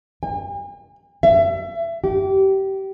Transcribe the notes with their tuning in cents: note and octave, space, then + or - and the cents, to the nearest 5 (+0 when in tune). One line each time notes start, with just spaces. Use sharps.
G#5 -45
E5 +30
G4 -25